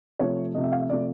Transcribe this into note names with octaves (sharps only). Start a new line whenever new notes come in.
C3 F3 A3 C#5
C3 F3 A3 D#5
E5
F5
E5
C3 F3 A3 D5